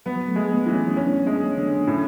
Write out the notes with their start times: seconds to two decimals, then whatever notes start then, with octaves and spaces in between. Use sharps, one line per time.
0.06 F#3 B3
0.28 A3
0.36 G#3
0.51 B3
0.66 E3
0.74 C#4
0.96 C#4 D4
1.27 G#3
1.57 D3
1.87 A2 C#4